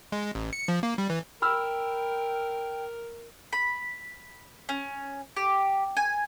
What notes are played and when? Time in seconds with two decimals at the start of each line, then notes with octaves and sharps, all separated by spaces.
0.12 G#3
0.35 A1
0.53 C#7
0.68 F3
0.83 A#3
0.98 G3
1.10 E3
1.42 A#4 G5 B5 E6 F6
3.53 B5
4.69 C#4
5.37 G4
5.97 G#5